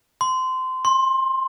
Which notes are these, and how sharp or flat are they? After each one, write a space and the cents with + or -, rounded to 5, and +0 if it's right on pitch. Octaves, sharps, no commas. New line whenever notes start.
C6 -20
C6 +20